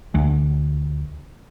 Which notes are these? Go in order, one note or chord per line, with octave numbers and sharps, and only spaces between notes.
D2